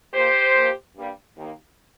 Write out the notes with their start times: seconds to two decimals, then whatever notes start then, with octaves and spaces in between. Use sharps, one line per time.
0.13 A#2 A#3 G4 C5
0.55 A#2 F3 A#3
0.95 G2 G3 A#3
1.36 D#2 D#3 A#3